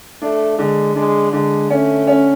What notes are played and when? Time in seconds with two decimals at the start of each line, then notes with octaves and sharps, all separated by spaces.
0.22 A3 D4
0.58 D3 G#3
0.96 G#3 D4
1.33 D3 G#3
1.70 A3 C#4
2.07 C#4